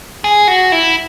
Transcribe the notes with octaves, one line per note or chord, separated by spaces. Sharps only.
G#4
F#4
E4